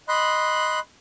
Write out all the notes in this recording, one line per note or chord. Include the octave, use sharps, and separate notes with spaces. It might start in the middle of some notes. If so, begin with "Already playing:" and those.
D#5 B5 C6 F#6